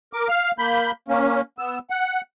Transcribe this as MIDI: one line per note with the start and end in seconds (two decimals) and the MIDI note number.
0.13 0.28 70
0.13 0.28 86
0.29 0.51 77
0.29 0.51 89
0.58 0.91 58
0.58 0.91 83
0.58 0.91 91
1.08 1.41 58
1.08 1.41 61
1.59 1.79 59
1.59 1.79 88
1.90 2.21 78